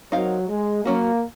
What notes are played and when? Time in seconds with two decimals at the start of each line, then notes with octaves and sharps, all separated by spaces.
0.12 F#3 C4 D#4 A#4 F5
0.48 G#3
0.84 F#3 A#3 C#4 F#4